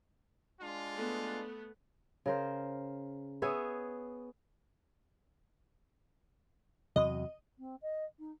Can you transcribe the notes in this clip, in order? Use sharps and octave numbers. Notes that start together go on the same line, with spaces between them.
G#3 D4 F4
A3 B3
C#3 A#4 C5
B3 G#4 C#5 E5
E2 C3 F#3 D#5
C4
D#5
D#4